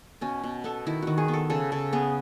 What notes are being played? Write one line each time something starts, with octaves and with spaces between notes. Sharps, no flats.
B2 C#4
B2
B3 A4
D#3 E4
D#3 F#4
G#4
B3
A4
C#3 A4
C#3 A4
B3 G#4